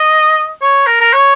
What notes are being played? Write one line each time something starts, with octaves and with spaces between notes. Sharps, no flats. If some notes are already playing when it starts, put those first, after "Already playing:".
Already playing: D#5
C#5
A#4
A#4
C#5